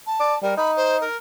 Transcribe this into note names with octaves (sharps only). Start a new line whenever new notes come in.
A5
D5
G3 A#4
D#4 B5
C5
A#4